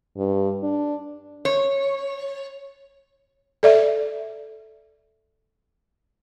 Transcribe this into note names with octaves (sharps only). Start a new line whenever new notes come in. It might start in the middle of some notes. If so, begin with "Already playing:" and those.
G2
D4
C#5
A4 D5 E5